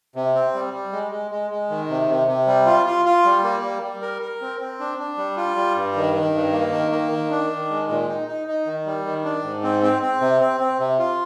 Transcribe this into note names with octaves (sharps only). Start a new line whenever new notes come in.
C3
C4
G3
G3
G#3
G#3
G#3
G#3
D#3
C3
C3
C3
G3
F4
F4
F4
G3
A#3
G3
G3
A#4
A#4
C4
C4
D4
D4
G3
F4
G3
G2
D#3
D#3
G2
A#3
D#3
A#3
D#3
D4
D#3
G#3
A#2
D#4
D#4
D#4
D#3
G3
D#3
D4
G#2
C4
C4
C4
C3
C4
C4
C3
F4